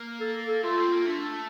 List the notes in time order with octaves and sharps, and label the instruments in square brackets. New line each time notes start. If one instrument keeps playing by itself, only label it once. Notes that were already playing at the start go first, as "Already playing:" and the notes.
Already playing: [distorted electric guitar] A#3
[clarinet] A4
A4
[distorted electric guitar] A3 [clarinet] F4
[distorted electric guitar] C4
A#3
[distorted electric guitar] A3 [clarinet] D4